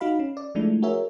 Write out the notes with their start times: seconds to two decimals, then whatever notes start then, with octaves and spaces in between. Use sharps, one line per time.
0.01 D#4 F#4 F5 B5
0.19 C#4
0.37 D5
0.55 F3 G#3 A3 D4 E4
0.82 F#4 G#4 A#4 C#5 E5